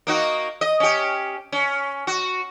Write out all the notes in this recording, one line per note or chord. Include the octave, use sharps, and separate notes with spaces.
A#3 D#4 F#4
D#5
C#4 G4
C#4
F#4